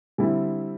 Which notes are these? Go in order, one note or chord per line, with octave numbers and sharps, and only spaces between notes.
D3 G3 C4 E4